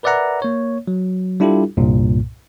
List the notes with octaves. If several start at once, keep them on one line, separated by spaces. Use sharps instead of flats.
A#4 B4 D5 E5 F#5 A#5
A#3 C#5
F#3
G3 D4 E4 F4 G4 A4
C2 G2 A#2